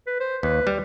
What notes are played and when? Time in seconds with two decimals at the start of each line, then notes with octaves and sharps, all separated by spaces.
0.07 B4
0.20 C5
0.43 D#2 B4
0.67 G3